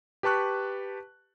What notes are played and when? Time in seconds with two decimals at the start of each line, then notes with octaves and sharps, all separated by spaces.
0.23 G4 B4 A5 C#6 F#6